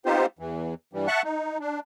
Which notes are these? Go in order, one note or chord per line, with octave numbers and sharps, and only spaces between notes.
B3 C4 D#4 F4 G4 C5
E2 E3
G2 E3 G3
E5 F#5 A5 C#6 F#6
D#4
D4